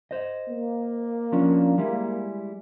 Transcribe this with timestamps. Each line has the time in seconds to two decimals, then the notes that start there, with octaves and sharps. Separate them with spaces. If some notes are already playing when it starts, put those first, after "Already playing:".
0.11 C5 D#5
0.49 A#3
1.32 F3 C#4 D4
1.78 G3 G#3 E4